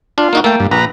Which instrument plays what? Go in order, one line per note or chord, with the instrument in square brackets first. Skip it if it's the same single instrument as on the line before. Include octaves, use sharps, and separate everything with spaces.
[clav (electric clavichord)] D4 [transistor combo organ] F4
[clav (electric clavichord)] A#3 D#4 F#4
[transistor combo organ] A3 [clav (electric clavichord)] A#3 G5
[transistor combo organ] G2
[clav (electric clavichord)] A#1 [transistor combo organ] B4 A#5